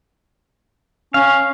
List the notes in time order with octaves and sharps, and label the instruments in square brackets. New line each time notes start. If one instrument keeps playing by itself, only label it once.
[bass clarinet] C#4 [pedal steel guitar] F5